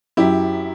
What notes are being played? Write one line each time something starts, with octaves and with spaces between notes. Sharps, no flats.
F#2 F#3 E4 G4